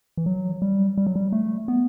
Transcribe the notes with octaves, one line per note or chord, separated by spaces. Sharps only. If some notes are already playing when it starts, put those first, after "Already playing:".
E3
F#3
G3
G3
F#3
G3
A3
B3